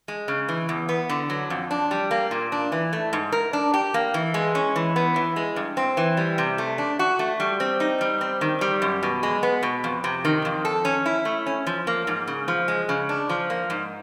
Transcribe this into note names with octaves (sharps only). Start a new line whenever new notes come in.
G#3
C#3
E3
E2
B3
D3
F#3
F2
D4
G3
A#3
A#2
D4
E3
A3
G#2
A#4
D4
G4
A#3
E3
G#3
C#4
E3
B3
E3
G#3
G2
C4
E3
G3
C3
A3
D4
F#4
A3
G3
C4
D#4
G3
C4
D#3
G3
F#2
B2
G#3
B3
B2
F2
C3
D#3
F2
A4
C#4
E4
A3
C#4
F3
A#3
G#2
C#3
F3
G#3
C#3
D4
F3
A#3
G#2